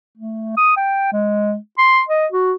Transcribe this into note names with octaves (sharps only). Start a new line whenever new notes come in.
A3
D#6
G5
G#3
C6
D#5
F#4